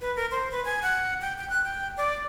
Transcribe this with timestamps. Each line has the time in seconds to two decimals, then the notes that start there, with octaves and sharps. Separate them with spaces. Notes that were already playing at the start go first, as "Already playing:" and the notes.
0.01 B4
0.16 A#4
0.31 C5
0.51 B4
0.65 G#5
0.82 F#5
1.21 G5
1.38 G5
1.50 F#6
1.64 G5
1.97 D5